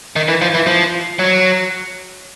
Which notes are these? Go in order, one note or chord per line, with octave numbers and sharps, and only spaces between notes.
D#3
E3
F3
E3
F3
F#3